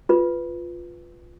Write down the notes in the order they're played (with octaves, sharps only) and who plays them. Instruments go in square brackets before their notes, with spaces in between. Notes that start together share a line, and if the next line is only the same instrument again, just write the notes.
[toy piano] F4 B4